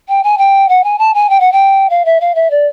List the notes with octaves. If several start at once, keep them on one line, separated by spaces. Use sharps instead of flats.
G5
G#5
G5
F#5
G#5
A5
G#5
G5
F#5
G5
F5
E5
F5
E5
D5